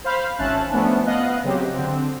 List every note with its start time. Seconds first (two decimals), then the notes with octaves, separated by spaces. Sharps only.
0.04 C5 F5 B5
0.39 G#1 C#4 E5 A5 F#6
0.71 F3 A3 B3 C#4 D4
1.06 B3 D#5 F5 F#6
1.43 C#3 F#3 C4 G4
1.74 D3 C4